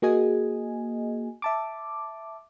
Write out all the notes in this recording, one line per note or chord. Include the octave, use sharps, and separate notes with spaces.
A#3 F#4 G#4 D#5 G#5
E5 A5 D6